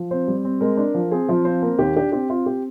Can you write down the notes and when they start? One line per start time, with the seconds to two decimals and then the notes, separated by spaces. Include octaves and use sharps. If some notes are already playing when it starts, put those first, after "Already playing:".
Already playing: F3
0.11 C4 C5
0.28 G3
0.45 C4
0.61 G#3 A#4
0.77 D4
0.94 F3
1.11 C4 G#4
1.28 F3 F4
1.45 C4 C5
1.62 A#3 A#4
1.79 D#2 G4
1.96 D4 G4
2.12 C4 G4
2.30 C4 F4
2.46 C4 G4